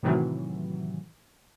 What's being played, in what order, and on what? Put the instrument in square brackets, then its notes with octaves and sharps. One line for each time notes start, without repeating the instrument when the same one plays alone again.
[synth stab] A2 C3 D#3 E3 F#3